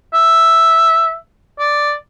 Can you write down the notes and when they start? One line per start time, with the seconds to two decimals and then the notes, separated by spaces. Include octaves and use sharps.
0.13 E5
1.59 D5